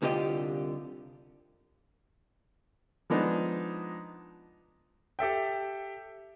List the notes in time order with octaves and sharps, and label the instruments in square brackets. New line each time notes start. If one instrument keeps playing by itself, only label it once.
[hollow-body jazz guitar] C2 D3 F4 G4 D#5
[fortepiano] F3 G#3 B3 D4 D#4
[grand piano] G4 A4 E5 G5